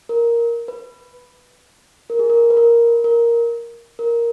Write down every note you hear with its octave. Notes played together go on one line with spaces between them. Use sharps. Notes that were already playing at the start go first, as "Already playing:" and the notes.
A#4
B4
A#4
G#4
A#4
B4
A#4
A#4
A#4